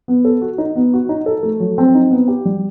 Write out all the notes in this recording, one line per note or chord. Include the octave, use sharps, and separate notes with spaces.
B3
A4
F#4
D#4
B3
F#4
D#4
A4
A3
F#3
C4
D#4
B3
G4
G3